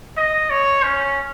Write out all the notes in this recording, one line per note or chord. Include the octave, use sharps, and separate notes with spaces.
D#5
C#5
C#4